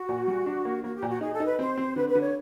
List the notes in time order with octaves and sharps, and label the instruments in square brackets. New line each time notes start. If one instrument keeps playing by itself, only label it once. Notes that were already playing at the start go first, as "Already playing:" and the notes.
Already playing: [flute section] F#4
[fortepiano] A#2
G3
D4
A#3
[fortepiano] A#3 [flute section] F#4
[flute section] G4
[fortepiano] A#2
[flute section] F#4
[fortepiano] D#4 [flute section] G#4
[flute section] A4
[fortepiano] D#4
[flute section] B4
[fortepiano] C4 [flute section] C5
[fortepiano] C4
[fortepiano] D3 [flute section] B4
[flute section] B4
[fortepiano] D3
[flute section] C#5